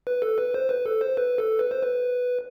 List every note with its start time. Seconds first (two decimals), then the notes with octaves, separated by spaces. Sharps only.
0.07 B4
0.22 A4
0.38 B4
0.54 C5
0.69 B4
0.86 A4
1.01 C5
1.17 B4
1.38 A4
1.59 B4
1.71 C5
1.83 B4